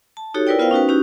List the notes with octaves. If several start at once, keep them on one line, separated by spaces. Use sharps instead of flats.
A5
D#4 F#4 G4 A4 C#5
E4 A#4 B4 D5 G5
B3 F4 A#4 C5 F5 G5
C#4 D#4 F#4 B4
C#4 D#4 E4 F#4 G4